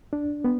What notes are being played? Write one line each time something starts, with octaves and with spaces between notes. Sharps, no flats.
D4
B3